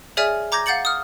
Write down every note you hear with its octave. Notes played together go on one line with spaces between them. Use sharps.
G#4 C#5 D5 E5 G#5 F6
A#5 D6 G6 G#6 A#6
F5 F#5 G6 A6 C#7 F#7
D#6 F6